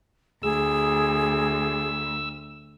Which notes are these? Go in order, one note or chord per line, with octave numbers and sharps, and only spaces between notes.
D2 G#4 E6